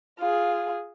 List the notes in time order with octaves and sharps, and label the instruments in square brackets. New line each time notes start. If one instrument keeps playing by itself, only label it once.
[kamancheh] F4 G#4